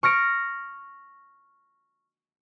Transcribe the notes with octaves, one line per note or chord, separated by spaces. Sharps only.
C#6 F6 A#6 D7